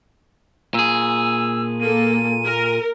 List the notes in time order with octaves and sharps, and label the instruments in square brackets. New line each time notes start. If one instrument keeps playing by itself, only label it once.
[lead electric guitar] A#2 G#4 [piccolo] E6
[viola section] A#3 A4 [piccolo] D#7
[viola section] A#4